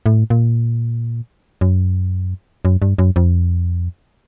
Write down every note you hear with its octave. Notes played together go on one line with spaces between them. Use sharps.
A2
A#2
F#2
F#2
G2
F#2
F2